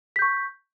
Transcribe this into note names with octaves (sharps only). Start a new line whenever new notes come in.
C#6 G6 B6